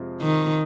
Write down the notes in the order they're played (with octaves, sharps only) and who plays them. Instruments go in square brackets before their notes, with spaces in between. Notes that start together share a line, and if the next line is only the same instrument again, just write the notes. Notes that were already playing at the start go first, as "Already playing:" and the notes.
Already playing: [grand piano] F2 C3 F3 G#3 F4
[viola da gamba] D#3